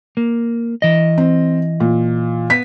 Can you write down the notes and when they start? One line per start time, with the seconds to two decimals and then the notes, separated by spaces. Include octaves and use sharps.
0.17 A#3
0.82 E3 D#5
1.18 C4
1.80 A#2
2.50 B3 B6